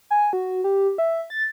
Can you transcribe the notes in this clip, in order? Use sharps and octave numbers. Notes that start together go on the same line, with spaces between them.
G#5
F#4
G4
E5
A6